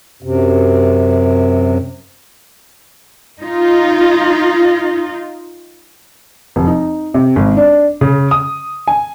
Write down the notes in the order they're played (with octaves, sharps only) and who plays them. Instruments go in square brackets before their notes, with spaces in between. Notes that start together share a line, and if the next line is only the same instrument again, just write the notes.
[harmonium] F#2 C3
[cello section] D#4 F4
[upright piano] F1
D#4
C3
G#1
D4
C#3
D#6
G#5